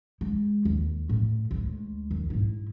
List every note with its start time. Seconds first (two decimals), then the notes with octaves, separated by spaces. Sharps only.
0.21 G#3
0.65 D#2
1.09 A2
1.51 D2 G#3
2.10 D#2
2.30 G#2 E4